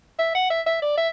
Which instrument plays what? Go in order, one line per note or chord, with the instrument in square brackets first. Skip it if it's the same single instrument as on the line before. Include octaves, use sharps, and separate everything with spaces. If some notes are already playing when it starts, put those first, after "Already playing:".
[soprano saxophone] E5
F#5
E5
E5
D5
E5